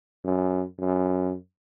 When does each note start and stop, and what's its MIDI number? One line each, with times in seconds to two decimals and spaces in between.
0.24 0.64 42
0.79 1.34 42